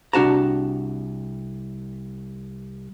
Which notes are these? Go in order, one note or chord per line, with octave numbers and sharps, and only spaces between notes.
C2 D4 F#4 A5 A#5